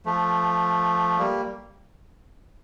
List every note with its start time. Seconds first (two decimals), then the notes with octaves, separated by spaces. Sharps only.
0.06 F3 A3
1.18 G3 A#3